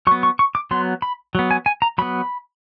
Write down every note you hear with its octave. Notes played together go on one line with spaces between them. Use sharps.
F#3 B3 C#6
C#6
C#6
D6
F#3 B3 C6
B5
F#3 B3
G#5
G#5
A#5
F#3 B3 B5